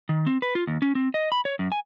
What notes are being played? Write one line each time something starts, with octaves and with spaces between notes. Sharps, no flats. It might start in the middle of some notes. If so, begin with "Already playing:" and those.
D#3
C4
B4
F4
D#2
C#4
C4
D#5
B5
C#5
F#2
G#5